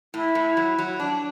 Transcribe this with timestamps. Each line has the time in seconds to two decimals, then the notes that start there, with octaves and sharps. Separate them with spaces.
0.14 A2 E4
0.35 A2
0.57 F#3
0.78 F#3
1.00 D4